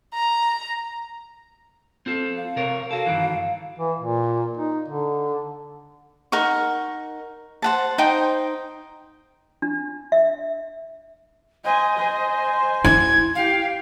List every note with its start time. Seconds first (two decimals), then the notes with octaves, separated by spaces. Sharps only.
0.14 A#5
2.06 C4 F4 A4
2.36 F5
2.56 C3 A#4 C#5
2.91 F#4 A4 F5
3.06 G2 D#3 E3
3.79 E3
3.99 A#2
4.57 D#4
4.88 D3
6.32 D#4 A#4 F#5 C#6
7.62 C5 F#5 A5
7.98 D#4 C5 G5 D#6
9.62 D4
10.12 E5
11.65 C5 D#5 G#5
11.96 C5 G#5
12.84 E4 G#6
13.35 G4 F5 G5